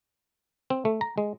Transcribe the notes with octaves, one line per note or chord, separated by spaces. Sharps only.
C4
A3
A#5
G#3